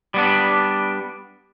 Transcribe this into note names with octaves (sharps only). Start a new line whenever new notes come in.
G3 B3 D4